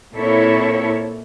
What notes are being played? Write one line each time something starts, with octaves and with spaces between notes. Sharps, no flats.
A#2 A#3 C4 E4 A4 C#5